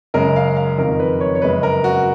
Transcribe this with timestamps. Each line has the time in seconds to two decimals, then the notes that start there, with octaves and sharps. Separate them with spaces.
0.14 F#2 C#3 G#3 A#4
0.36 F5
0.56 F5
0.78 F2 D#3 G#3 A#4
1.00 B4
1.21 C#5
1.35 C#5
1.42 F#2 C#3 G#3 B4
1.63 A#4
1.84 F#4